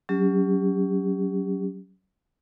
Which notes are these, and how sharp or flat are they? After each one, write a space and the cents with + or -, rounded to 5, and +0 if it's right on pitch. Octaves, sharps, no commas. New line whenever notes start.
F#3 +25 C#4 +20 G4 +25